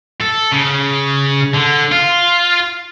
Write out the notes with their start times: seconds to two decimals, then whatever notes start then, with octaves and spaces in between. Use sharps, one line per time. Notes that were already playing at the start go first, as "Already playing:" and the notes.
0.21 A4
0.52 C#3
1.55 D3
1.92 F4